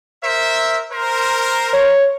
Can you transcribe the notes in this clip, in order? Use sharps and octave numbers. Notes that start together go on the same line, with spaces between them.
A#4 C5 E5
A#4 C5
C#5